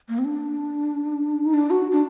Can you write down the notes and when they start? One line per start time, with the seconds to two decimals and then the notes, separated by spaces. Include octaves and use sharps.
0.09 A#3
0.19 C4
0.25 D4
1.45 D#4
1.54 D4
1.70 F#4
1.92 D4